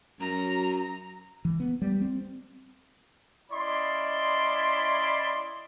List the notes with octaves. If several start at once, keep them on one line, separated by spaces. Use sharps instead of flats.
F#2 F#3 A#5
E3
B3
G3
C4
C#4 E4 D5 D#5 B5 C6